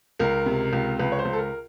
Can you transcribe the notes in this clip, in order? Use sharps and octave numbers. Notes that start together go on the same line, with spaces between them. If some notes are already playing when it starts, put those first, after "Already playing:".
C#2 A#4
C3
C#2
C#2 B4
C#5
C5
C#2
A4
A#4